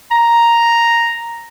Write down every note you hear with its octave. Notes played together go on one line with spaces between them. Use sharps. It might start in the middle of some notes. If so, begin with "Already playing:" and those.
A#5